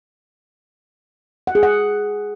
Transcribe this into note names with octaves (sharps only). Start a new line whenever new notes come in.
F#5
G#4
F#5